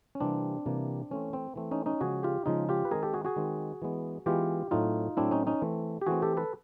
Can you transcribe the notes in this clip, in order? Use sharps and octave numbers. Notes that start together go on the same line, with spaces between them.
C#4
C3 E3 G3 A#3 C4 D4
C3 E3 G3 A#3
E3 A3 C4 C#4
C4
E3 A3 C4
C#4 D#4
C#4 D#4
C#3 F3 G#3 F#4 G#4
F4 G4
C#3 F3 G#3 D#4 F4
F4 G4
B4
D#3 G#3 C4 G#4 A#4
G4 A4
F#4 G#4
F#4 G#4
D#3 G#3 C4
E3 G#3 B3
E3 G#3 B3 F4 G4
A2 F#3 A3 C4 D#4 F4
A2 F#3 A3 C4 D4 E4
C#4 D#4
C#4 D#4
E3 A3 C4
G4
E3 A3 C4 F#4 G#4
G4 A4
A4 B4